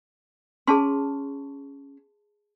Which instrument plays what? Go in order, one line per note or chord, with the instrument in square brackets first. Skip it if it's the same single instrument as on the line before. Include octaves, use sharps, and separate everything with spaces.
[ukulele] C#4 [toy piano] G#4 A5 C6